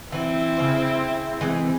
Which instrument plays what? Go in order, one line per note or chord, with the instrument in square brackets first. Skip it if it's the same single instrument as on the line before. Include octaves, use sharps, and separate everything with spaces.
[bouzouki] E3 G#5 [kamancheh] C4 E4
[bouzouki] C#3 C5
E3 G#3 C4